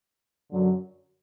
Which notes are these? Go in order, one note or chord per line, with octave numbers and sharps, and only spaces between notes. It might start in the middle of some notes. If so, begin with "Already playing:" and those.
F#2 D3 F#3